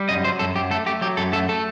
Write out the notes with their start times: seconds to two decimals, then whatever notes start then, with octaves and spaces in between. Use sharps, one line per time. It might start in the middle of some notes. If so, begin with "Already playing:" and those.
Already playing: G3
0.09 F#2 D#5
0.24 F#3 C5
0.39 F#2 A4
0.55 F#2 G4
0.71 A3 A4
0.86 A3 G4
1.01 F#3 G4
1.17 F#2 A4
1.32 A3 A4
1.49 A3 A4